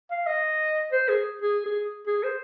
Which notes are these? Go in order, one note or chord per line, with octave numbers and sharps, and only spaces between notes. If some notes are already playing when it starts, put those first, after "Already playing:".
F5
D#5
C5
G#4
G#4
G#4
G#4
C5